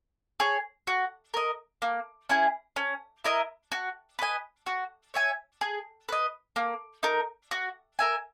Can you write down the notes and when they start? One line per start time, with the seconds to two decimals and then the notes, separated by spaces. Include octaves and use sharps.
0.40 G#4 C#5
0.87 F#4
1.34 A#4 D#5
1.82 A#3
2.29 C#4 E4 G#4
2.76 C#4
3.24 E4 A#4 D#5
3.72 F#4
4.19 B4 D#5 G#5
4.66 F#4
5.14 C#5 E5 G#5
5.61 G#4
6.09 B4 D#5
6.56 A#3
7.03 D#4 A#4
7.51 F#4
7.99 A#4 E5 G#5